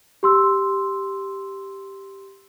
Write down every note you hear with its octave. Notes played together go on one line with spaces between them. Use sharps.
G4 C6 E6